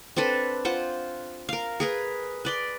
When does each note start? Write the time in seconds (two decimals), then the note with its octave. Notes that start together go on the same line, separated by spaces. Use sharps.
0.16 C4 D4 A4 B4
0.65 F4 C5 F#5
1.49 A#4 F5
1.80 G#4 A#4 B4
2.45 B4 D5 C6